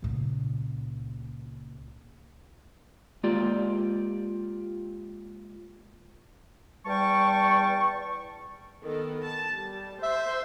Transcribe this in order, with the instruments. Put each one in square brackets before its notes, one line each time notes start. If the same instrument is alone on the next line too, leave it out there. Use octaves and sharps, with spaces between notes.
[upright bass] C#2 A#2
[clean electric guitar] G#3 A#3 F4 G4 D5
[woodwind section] E2 G3 G5 A5 C#6
[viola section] D#3 B3 A4
A5
G3
[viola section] C5 C6 [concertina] E5